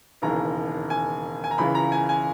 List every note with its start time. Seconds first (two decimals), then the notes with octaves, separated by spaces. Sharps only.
0.22 E1 D#2 C#3 E3 A#5
0.90 G#5
1.44 G#5
1.51 A#5
1.58 C#2 C#3 E3 B5
1.75 A#5
1.92 G#5
2.09 G#5